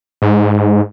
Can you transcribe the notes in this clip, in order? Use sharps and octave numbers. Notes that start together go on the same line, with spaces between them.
G#2